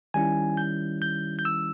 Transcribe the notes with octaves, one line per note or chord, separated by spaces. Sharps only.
D#3 G3 C#4 E4 G#5
G6
G6
G6
E6